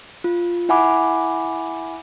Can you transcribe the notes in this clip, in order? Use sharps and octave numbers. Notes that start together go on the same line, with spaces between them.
F4
E4 E5 F#5 G#5 B5 D6